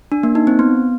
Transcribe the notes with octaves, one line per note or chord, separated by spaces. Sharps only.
D4
A#3
D#4
C4
B3